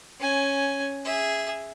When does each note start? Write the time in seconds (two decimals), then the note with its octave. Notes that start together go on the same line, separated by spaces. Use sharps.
0.20 C#4 G#5
1.05 G#4 E5